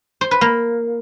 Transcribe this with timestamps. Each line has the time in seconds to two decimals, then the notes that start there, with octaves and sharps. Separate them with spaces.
0.21 C5
0.31 B4
0.41 A#3